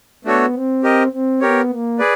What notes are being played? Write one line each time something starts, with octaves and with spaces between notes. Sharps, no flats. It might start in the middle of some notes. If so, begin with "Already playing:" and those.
A3 B3 D4 F#4 A4 C#5
C4
G4 A#4 D#5
C4
B3 G4 A#4 C#5
A#3
G#4 B4 D5